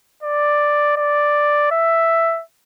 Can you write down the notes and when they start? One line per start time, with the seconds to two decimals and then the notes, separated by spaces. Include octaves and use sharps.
0.23 D5
0.97 D5
1.71 E5